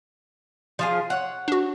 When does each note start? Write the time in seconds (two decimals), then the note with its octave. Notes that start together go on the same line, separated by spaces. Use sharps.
0.79 F3 F4 G#4
1.10 C#5 F#5
1.48 D4 F#4